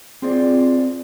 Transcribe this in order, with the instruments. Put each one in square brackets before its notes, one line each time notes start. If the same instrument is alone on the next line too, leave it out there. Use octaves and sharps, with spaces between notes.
[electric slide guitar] C4 F4 G#4 C5 D5